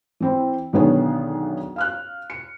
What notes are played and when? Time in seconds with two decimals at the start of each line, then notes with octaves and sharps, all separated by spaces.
0.20 E3 C4 E4
0.73 B1 D3 D#3 B3 G#4 C#5
1.76 F5 F6 F#6
2.30 C#7